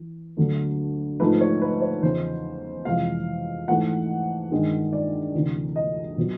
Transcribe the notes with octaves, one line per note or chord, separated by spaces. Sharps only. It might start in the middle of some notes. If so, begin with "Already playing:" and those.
Already playing: E3
D2 D3 F#3 A3
G#2 F3 A3 B4
C#5
B4
C#5
E2 C#3 F3 C5
F2 C3 E3 G#3 F5
G#2 E3 A3 F#5
G2 D#3 G#3
D5
D2 C3 E3
D#5
B2 F#3